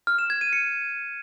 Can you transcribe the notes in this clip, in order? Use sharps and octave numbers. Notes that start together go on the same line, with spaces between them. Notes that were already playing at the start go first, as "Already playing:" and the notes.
F6
E7
G#6
D#7
C#7